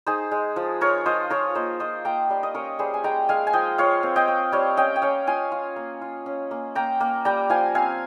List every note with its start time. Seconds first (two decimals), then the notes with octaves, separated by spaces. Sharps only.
0.06 D#4 G#4 C5
0.31 G#3
0.56 F3
0.81 F4 A#4 C#5
1.06 F4 C5 D#5
1.30 F4 A#4 C#5
1.55 A#3 C5 D#5
1.80 F4 C5 D#5
2.05 A#3 G5 A#5
2.30 G3 F5
2.43 D#5
2.54 C#4 A#4 C#5
2.79 G3 G#4 C5
2.94 G#5
3.04 G#3 G5 A#5
3.29 G#3 F5 G#5
3.47 G#5
3.53 F3 D#5 G5
3.78 F4 C#5 F5
4.03 C4
4.16 D#5 G5
4.28 C4
4.52 G3 C#5 F5
4.77 C#4 D#5 G5
4.96 G5
5.02 C#4 C#5 F5
5.27 F4 F5 G#5
5.52 F4
5.76 A#3
6.01 F4
6.26 C#4
6.51 A#3
6.75 A#3 G5 A#5
7.00 A#3
7.25 G3 G5 A#5
7.50 F3 F5 G#5
7.75 C4 F5 G#5